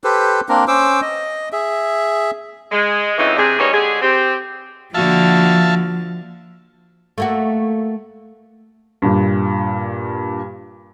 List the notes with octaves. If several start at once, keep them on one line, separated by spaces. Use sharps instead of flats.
G4 A4 B4 C5
A#3 C4 D4 A#4
C#4 C5 D6 E6
D#5
G#4 E5
G#3
F2 C#3 E3 G#3 D#4 E4
C3 D4 G#4
G3 A#3 B3 C#4 D#4 C#5
D3 G#3 G4 G#4
C4 G4
D3 F3 A#3 F#4 E5 F5 A5
A3 A#3 F#4
G2 A#2